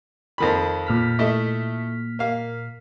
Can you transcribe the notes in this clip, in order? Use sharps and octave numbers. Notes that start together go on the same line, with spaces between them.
F2 D#3 B5
A#2 F6 B6
A3 E4 D#5
A#3 F5